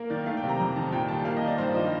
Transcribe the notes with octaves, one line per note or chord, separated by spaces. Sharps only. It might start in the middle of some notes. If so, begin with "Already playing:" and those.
Already playing: A#3 A#4
D#3 D5
A3 F5
G5
C3
A#5
F2 A#5
D#3 A5
A#2 G5
G3 A5
A#3 F5
D#5
D#3
D5
G2 C5
F3 D#5